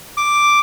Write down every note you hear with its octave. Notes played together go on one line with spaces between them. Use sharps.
D6